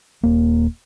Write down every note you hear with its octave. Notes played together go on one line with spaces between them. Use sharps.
D#1 A#3